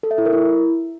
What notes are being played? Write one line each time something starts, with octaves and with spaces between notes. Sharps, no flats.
A4
E5
E4
A#4
E4